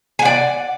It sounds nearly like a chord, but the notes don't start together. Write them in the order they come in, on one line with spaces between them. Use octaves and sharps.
G#5 F#5 D5